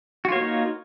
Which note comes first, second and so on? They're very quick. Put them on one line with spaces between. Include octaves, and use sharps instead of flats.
F#4 F4 C#5 A#3 D#4